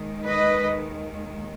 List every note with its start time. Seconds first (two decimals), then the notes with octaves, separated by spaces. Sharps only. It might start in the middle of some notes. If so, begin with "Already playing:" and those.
Already playing: D#2 D#3 G#3
0.26 B4 D#5